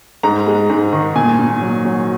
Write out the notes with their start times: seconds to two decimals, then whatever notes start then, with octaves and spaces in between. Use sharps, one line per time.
0.23 G#2 A#5
0.47 G#3
0.69 G#2
0.93 D#3
1.16 A#2 G#5
1.39 A#2
1.61 F#3
1.85 F#3